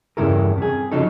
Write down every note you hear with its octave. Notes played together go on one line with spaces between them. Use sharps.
E2 G2 C#3 E4 A4 A#4
C3 G#4
C#3 F3 F#3 D#4 A4